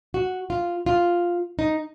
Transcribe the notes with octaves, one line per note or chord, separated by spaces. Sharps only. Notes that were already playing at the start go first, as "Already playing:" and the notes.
F#4
F4
F4
D#4